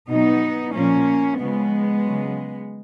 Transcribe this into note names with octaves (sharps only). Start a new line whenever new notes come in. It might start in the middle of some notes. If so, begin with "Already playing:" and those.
B2 F#3 B3 D#4
A#2 F3 A#3 C#4
C#3 F3 G#3 B3
C#3 F#3